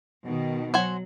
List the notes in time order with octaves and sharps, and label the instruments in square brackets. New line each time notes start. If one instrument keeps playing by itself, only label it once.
[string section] B2 D#3
[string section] F#3 [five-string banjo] C5 F#5 G#5